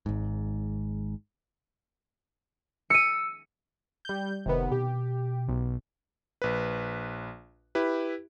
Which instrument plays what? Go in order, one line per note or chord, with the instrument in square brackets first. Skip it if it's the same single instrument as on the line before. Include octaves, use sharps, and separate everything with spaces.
[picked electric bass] G#1 G#2
[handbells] E6 [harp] C#7 D#7
[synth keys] G3 G6
[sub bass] F1 [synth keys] C3 D#3 B3
[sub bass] B2 [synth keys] G4
[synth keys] B1
[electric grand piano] A#1 B4
E4 G4 B4